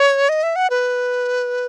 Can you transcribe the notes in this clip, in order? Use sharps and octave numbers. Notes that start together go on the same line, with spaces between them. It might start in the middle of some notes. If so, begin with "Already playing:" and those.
Already playing: C#5
D#5
E5
F#5
B4